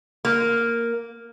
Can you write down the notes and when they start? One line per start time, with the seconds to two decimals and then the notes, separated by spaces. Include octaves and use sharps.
0.25 A#3